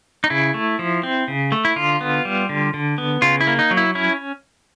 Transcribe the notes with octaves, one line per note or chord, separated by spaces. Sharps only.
D#4
C#3 E4
A3
F3
C4
C#3
A3
E4
D3 F4
B3
G3
D3
D3
B3
C#3 F4
E4
A#3
D#4
F#3
E4
C#4 E4